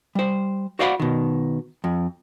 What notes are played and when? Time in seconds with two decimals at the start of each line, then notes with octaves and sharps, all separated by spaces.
0.15 G3 C5
0.79 F#4 C5 D5 F5 F#5 B5
1.00 B2 D#3
1.84 F2